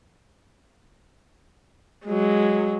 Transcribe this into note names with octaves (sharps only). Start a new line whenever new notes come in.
F#3 G#3